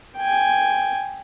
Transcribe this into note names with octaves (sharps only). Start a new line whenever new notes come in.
G5 G#5